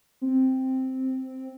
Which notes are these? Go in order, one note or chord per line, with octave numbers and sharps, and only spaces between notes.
C4